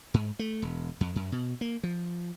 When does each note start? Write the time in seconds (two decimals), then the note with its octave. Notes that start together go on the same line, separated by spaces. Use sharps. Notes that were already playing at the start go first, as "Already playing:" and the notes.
0.14 G#2
0.39 A3
0.62 E1
1.01 F2
1.16 F#2
1.32 B2
1.61 A#3
1.83 F3